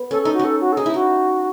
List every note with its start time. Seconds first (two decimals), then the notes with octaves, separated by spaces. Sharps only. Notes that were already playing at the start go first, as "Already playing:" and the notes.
Already playing: B3
0.11 C#4 A4
0.22 A4
0.25 D#4
0.34 F#4
0.39 C#4 A4
0.61 F#4
0.72 A4
0.77 D#4 G#4
0.86 E4
0.94 D#4 F#4